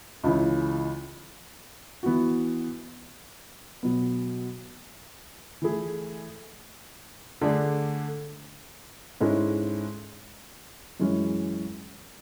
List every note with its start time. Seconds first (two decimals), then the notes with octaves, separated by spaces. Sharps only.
0.24 C#2 C#3 E3
2.03 E3 B3 F#4
3.83 B2 F#3 B3
5.62 E3 A3 E4 G#4
7.41 D3 A3 D4 G#4
9.21 G#2 G#3 C#4 E4 A4
11.00 F#2 E3 G#3 C#4